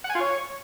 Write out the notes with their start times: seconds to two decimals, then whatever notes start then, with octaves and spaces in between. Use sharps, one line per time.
0.04 F#5
0.10 G#5
0.15 F4
0.20 C#5